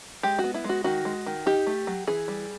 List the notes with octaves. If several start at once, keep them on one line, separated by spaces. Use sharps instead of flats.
G#3 G4
F#4
B3
E4
G#3 F#4
D#3 F#4
G#3
D#3
D#4 G4
A3
F#3
E3 G#4
G3